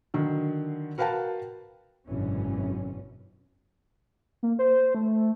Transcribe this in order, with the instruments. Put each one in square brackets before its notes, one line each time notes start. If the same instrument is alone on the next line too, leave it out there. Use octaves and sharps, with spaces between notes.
[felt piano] D3 D#3 F#3
F#4 A#4 B4 F5 G5 A5
[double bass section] G#1 F#2 B2 D3 E3 C#4
[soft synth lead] A#3
C5
A3